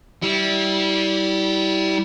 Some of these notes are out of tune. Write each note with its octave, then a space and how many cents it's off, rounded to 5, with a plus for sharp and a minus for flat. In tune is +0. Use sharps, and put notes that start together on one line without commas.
G3 -20 E4 -20